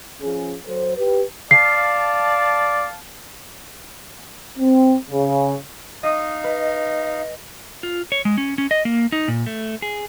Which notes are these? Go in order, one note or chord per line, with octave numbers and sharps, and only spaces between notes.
F3 C#4 G#4
F#3 A4 C5
G4 B4
D5 F5 A5 C7
C4
C#3
D#4 D#5 F5 D#6
B4 D#5
F4
C#5
G#3
C#4
C#4
D#5
A#3
D#4
A#2
A3
G#4